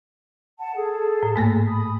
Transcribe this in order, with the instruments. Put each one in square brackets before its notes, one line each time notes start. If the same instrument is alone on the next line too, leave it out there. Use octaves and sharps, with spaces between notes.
[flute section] F#5 A5
G#4 A4
[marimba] A2
G#2 A3 A#3
[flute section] B5 D#6